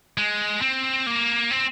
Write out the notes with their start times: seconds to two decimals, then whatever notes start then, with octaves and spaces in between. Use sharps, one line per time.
0.18 G#3
0.62 C4
1.07 A#3
1.51 C4